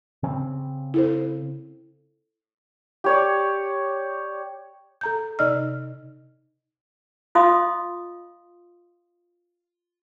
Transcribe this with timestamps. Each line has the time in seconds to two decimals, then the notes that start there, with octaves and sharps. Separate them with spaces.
0.23 C#3 C4
0.94 E4 A4 C5
3.04 G4 C#5 D5
5.01 A4 A#5 G6
5.39 C3 D#4 D5 D#5 E6 F6
7.35 F4 D#5 F5 C6 D#6